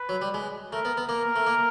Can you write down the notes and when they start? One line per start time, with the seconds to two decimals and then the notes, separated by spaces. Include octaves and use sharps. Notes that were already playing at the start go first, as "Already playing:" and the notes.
Already playing: B4
0.09 F#3
0.22 G3
0.34 G#3
0.73 A3 A#4
0.85 B3
0.98 B3
1.09 A#3 A#4
1.36 A3
1.47 A#3